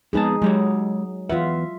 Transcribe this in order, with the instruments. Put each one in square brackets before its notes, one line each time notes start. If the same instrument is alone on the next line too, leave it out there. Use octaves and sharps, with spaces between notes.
[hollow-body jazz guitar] F2 B3 A5 [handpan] G#3 D#4 G#4
[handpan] F#3 [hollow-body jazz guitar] G#3 G4 C#5
[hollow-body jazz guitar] E2 B4 F#5 [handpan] F4 E5